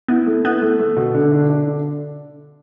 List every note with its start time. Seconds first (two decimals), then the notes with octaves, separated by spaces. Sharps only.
0.08 B3 E4
0.27 A3
0.44 B3 E4
0.62 A3
0.79 A3
0.97 B2
1.15 D3
1.32 D4
1.50 D4
1.67 D3